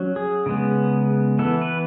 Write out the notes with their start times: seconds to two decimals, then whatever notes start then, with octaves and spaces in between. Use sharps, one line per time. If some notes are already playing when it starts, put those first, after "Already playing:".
Already playing: F#3 C#4
0.16 G#4
0.46 C#3 G#3 B3
1.39 E3 B3 A4
1.61 B4